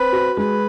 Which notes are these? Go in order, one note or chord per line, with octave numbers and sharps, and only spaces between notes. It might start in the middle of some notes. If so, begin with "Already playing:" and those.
Already playing: C4 B4
F#4
G#3 B4